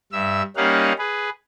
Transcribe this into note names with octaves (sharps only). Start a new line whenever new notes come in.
G2 E5 E6
G3 A#3 C#4 D#4 F5 F#5
G#4 B4